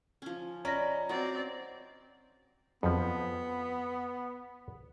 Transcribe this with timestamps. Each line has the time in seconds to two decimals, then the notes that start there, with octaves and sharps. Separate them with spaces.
0.22 F3 C#4
0.65 C#4 D5 D#5 A#5 B5 A#6
1.09 C4 F#4 D5
2.83 F2 F3 B3